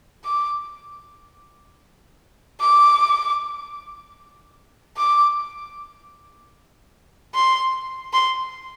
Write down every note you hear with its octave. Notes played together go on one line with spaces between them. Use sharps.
D6
D6
D6
C6
C6